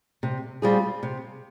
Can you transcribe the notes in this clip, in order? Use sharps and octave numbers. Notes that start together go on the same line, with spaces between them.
C3
G3 C4 F4 G#4
C3